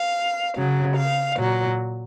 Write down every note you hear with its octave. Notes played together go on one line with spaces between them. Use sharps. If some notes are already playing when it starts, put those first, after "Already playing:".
Already playing: F5
C#3 F#3
F5
A#2 F#3